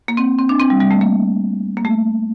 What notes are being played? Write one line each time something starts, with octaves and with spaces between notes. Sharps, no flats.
A#3
C4
C4
D4
C4
G3
G3
A3
A#3
A#3
A3